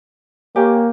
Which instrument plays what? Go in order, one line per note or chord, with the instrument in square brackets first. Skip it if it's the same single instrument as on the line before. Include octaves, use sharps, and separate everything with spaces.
[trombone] A#3 [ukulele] G4 C#5 G#5